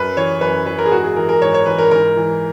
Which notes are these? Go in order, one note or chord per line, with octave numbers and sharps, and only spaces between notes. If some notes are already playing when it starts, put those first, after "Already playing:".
Already playing: F#2 B4
E3 C#5
F#2 B4
E3 B4
A#4
G#4
G#2 F#4
G#4
E3 A#4
A#4
G#2 C#5
C#5
E3 B4
A#4
G#2 A#4
E3